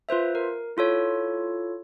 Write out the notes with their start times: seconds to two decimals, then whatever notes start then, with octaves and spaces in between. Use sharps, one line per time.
0.09 F4 B4 C5 E5
0.35 A#4
0.77 E4 F4 A4 C#5